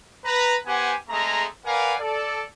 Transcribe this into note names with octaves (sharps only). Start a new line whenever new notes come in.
B4 A#5
B3 G4 C5 F#5 G#5
G#3 A3 C4 G#4 A#5
A#4 B4 D5 F5 F#5 G#5
A4 D5